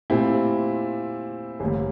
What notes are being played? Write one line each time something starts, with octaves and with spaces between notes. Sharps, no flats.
A#2 A3 C4 E4 G4
A1 G2 D3 G3 A#3